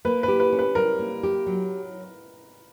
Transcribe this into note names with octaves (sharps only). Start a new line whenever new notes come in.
A#3 B4
G4 B4
B4
C#4
B4
G3 A#4
A#3
G4
F#3